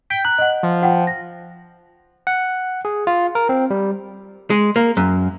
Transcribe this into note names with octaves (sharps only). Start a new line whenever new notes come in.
G5 G6 B6
A#5 F#6
D#5 F#5
F3
F4 F#5 G5
A#6
F#5
G#4
F4
A#4
C4
G3
G#3
A#3
F#2